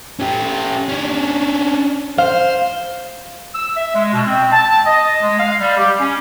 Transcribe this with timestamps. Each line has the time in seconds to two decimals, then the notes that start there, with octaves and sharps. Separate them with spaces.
0.20 C#4 G4
0.89 C#4 D4
2.18 C5 F5
3.55 E6
3.76 E5
3.95 G#3
4.14 B2
4.27 C4
4.52 A5
4.86 D#5
5.23 G#3
5.40 F5
5.60 G3
5.77 G4
6.00 C#4